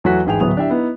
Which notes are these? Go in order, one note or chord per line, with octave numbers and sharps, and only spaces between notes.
E2 F#3 A3 F#4 B6
A1 G#2 G#4 G5 F7
D1 A2 F#3 B3 D#6 F7
D4 E4 G4 E5
B3 D#4 E4